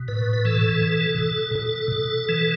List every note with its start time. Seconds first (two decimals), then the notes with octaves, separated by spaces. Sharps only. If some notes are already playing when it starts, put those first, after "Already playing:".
Already playing: B2
0.08 A2 B4
0.33 B4
0.45 E3 A4
0.82 B2
1.19 B2
1.55 B2 A4
1.92 B2
2.29 E3